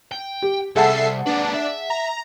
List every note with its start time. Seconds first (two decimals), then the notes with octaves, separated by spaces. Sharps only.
0.12 G5
0.42 G4
0.76 C2 G#4 A4 E5 F#5 A5 C7
1.26 A#3 D4 B4
1.55 E5
1.90 A#5